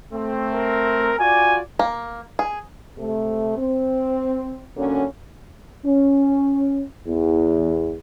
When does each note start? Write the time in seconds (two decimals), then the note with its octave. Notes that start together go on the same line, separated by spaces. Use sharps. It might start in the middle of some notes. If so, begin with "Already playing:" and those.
0.13 A3 C4
0.54 A#4
1.19 F4 F#4 D5 G#5
1.79 A#3
2.39 G#4
2.98 C3 A3
3.57 C4
4.77 D3 F#3 A#3 C#4
5.86 C#4
7.08 E2